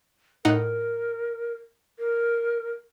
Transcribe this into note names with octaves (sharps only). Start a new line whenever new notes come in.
A2 D#4 A#4 F#5
A#4